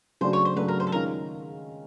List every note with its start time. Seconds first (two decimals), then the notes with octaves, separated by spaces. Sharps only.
0.21 C#3 F#3 A3 D4 F#4 C5
0.33 C#5
0.45 C5
0.56 C#3 F#3 A3 D4 F#4 B4
0.68 A#4
0.80 C5
0.87 A4
0.92 D#3 G#3 C#4 F4 A#4